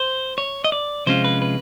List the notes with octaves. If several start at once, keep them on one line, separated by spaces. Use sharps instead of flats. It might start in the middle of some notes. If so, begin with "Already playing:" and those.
Already playing: C5
C#5
D#5
D5
C3 F3 G#3 C#4 F4 C5
B4
B4